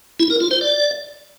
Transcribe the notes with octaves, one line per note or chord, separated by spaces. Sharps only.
E4
A#4
F4
C5
D5